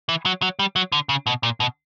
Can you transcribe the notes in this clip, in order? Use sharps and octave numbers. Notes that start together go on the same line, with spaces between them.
E3
F#3
F#3
G3
F#3
D3
C#3
B2
A#2
B2